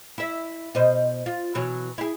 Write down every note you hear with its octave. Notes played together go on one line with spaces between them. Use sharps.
E4 E5
B2 C5 D#5
F4
B2 E3 F#3
E4 G#4